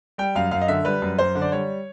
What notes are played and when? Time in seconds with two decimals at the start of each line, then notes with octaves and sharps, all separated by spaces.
0.18 G3 G5
0.35 F#2 F5
0.51 F#2 F5
0.61 D#5
0.68 D3 E5
0.85 G3 B4
1.02 F#2
1.18 F#2 C5
1.35 D3
1.42 D5
1.52 G3 C#5